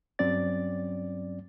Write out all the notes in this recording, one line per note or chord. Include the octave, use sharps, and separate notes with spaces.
G2 F#3 C4 C#4 D5 A6